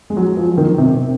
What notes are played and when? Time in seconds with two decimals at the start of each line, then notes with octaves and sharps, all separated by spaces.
0.10 G#3
0.17 F#3
0.37 F3
0.58 D#3
0.78 C3
0.94 C3